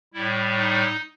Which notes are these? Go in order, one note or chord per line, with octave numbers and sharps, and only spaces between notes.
A2 G3 E4
D#4